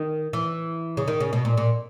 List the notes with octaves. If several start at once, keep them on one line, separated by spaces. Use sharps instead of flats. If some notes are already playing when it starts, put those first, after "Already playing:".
Already playing: D#3
E3
C#3
D#3
C#3
B2
A#2
A#2